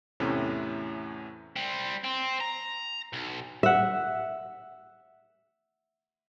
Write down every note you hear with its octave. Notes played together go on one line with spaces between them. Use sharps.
E2 A2 C3 A3 C#4 E4
G3 C4
C4
A#5
B1
E5 F#5